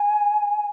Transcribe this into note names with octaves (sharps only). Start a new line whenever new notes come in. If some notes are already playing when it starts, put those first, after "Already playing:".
Already playing: G#5